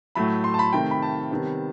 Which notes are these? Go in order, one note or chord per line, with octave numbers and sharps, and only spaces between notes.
A2 F#3 A3 B5
C6
A5
B5
C3 D#3 A3 G5
B5
A5
C3 D#3 G3 B3